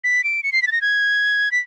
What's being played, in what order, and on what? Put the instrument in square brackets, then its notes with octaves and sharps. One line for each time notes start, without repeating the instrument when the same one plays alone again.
[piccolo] B6
D7
C#7
C7
B6
A6
A#6
G#6
B6